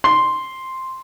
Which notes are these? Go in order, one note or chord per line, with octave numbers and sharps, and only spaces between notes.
C6